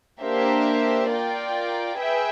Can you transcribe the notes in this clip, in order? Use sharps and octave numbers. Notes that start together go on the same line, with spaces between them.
A#3 D4 G4 C5 E5
F4 A#4 D5 G5
G#4 B4 E5 G5